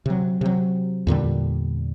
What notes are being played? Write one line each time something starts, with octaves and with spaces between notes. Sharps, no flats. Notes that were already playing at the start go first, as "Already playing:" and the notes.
C3 F#3
C3 F#3
E2 A#2 D3 G3